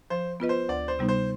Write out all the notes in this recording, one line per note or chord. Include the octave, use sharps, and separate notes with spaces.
F3 C5
B3 F4 B4 D#5
C5
D2 D5
C5
C3 G3 B3 D#4
C5